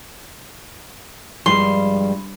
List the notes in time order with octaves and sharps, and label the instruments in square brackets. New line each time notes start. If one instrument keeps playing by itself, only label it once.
[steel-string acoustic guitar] G2 [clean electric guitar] F3 G3 G#3 [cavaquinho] C6